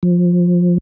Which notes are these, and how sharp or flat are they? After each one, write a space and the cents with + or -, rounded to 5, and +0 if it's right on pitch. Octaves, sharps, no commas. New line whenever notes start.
F3 +15